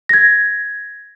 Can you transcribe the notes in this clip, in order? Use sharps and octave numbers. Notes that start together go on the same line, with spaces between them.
G#6 A#6